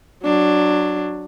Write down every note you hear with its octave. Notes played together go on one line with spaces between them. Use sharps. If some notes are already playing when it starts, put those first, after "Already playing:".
F#3 D4